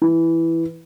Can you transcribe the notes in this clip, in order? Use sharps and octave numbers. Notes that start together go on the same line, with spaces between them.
E3